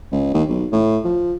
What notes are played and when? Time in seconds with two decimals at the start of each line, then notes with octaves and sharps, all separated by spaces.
0.12 C#2
0.34 D#2
0.49 B1
0.72 A2
1.04 F3